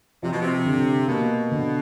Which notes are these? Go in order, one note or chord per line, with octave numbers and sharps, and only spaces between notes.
C3 F3
B2
C3
D3
B2 A#3
D3